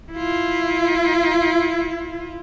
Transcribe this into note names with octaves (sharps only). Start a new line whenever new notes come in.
E4 F4